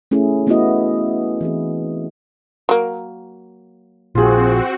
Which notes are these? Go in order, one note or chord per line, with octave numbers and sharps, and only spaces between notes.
A3 C#4 E4 G#4
A3 B3 C#4 E4 F#4 D#5
E3 C4 G#4
F#3 A#3
A#1 C4 F4 F#4 G#4